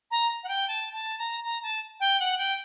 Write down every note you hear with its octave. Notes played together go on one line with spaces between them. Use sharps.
A#5
F#5
G5
A5
A5
A#5
A#5
A5
G5
F#5
G5